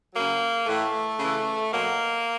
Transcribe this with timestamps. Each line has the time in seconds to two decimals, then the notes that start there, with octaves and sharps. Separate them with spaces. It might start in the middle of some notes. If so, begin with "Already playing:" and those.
0.14 C#3 F#3 A#3
0.67 A2 E3 A3
1.18 C#3 E3
1.70 B2 F#3 A#3